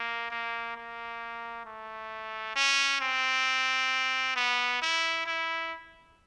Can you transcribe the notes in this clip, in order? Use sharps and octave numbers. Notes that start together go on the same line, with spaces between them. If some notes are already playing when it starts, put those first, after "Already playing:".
Already playing: A#3
A#3
A#3
A3
C#4
C4
B3
E4
E4